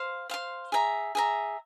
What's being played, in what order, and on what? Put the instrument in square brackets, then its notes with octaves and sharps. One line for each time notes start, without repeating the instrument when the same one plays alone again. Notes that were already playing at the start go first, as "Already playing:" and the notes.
Already playing: [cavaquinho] C5 F5 C6
C5 F5 C6
G#4 E5 A#5
G#4 E5 A#5